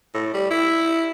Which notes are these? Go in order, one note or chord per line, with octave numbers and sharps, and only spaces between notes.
A2
G3
E4